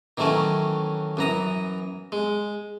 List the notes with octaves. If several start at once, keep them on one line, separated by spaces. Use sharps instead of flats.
D#3 E3 F#3 A3 C#4
F#2 E3 A#5 D#6
G#3